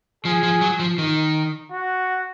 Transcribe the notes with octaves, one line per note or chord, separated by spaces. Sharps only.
F3 G#4
F3
F#3
F3
D#3
F#4